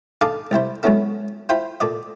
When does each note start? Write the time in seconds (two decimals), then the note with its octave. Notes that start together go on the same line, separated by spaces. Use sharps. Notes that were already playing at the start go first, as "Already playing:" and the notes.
0.21 D#4 G#4 A4 F5 A5 D6
0.51 C2 G3 E4 C5
0.83 F#3 G#3 B3 C#4 E4 A4
1.49 E4 F4 C5 G5 B5
1.80 A#2 A4 D5 D#5